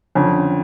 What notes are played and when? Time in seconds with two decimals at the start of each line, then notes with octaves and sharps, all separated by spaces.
0.15 F2 D3 C#4